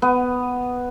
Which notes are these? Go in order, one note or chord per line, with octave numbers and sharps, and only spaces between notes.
B3